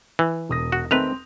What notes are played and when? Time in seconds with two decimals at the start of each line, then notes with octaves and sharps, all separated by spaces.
0.19 E3
0.49 E1 D#6 A#6
0.72 F#4
0.91 D#3 A3 C4 B4 F7